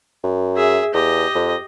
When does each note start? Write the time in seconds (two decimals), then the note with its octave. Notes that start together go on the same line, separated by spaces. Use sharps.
0.23 F#2
0.56 G#4 E5
0.94 E2 G4 D#5
1.35 F2